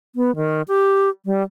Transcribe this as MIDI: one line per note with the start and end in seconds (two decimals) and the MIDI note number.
0.16 0.35 59
0.36 0.62 51
0.68 1.09 67
1.26 1.42 55